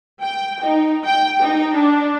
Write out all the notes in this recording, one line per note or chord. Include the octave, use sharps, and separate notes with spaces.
G5
D#4
G5
D#4
D4